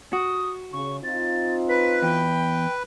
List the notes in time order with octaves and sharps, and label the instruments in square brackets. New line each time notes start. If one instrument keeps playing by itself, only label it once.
[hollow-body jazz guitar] F#4 [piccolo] D#6
[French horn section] C#3 [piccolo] C#6
[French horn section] C4 D#4 F4 [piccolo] A6
[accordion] B4 [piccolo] B6
[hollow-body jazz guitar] E2 [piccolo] G5